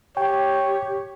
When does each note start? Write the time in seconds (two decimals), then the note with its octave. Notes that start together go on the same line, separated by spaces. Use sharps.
0.17 G4 C#5 G5